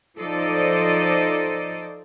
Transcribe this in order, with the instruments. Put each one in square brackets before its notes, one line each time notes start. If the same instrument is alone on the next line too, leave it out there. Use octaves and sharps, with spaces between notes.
[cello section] F3 D#4 A4 C5 D5 D#5